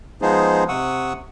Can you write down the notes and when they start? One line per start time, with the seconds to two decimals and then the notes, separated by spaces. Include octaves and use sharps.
0.22 F3 G#3 B3 D#4 G#4 C5
0.69 C3 F#5 C#6 D#6 E6